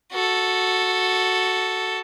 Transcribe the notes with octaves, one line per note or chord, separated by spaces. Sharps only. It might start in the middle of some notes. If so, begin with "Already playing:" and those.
F#4 A4